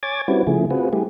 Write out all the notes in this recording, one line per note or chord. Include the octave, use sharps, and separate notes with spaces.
C#5 G#5 D6 G#6 A6
G3 C4 C#4 E4 F#4 B4
C#3 F3 A3 E4 G#4
C4 F4 F#4 G#4 B4
G3 A3 E4 G4 G#4